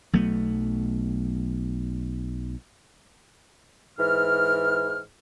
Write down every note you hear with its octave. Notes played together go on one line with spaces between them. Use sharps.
B1 F#3 A3 B3
G#2 E3 F6